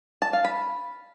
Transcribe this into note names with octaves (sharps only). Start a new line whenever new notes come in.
A5
F5
B5